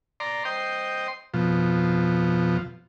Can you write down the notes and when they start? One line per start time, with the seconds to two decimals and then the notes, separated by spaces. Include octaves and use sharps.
0.20 D5 A#5 C6
0.45 C5 D#5 G5 C6
1.34 F2 B2 F3